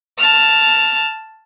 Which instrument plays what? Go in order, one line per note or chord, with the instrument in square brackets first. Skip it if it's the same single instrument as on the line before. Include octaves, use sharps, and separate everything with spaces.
[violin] A5 F6